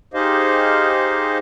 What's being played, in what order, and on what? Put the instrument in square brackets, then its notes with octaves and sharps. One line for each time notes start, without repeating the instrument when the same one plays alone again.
[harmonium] D#4 G4 G#4 C5 D#5 F5